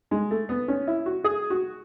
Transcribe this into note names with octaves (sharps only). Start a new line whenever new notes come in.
G#3
A3
B3
C#4
E4
F#4
G#4
F#4